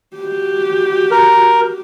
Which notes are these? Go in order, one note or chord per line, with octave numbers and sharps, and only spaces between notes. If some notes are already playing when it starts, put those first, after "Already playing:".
F#4 G4
A#4